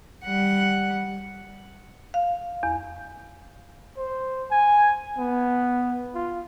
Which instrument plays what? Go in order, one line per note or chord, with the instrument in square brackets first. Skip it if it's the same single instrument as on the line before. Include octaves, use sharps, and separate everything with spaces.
[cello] G3 F#5
[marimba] F5
E2
[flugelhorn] C5
G#5
B3
F4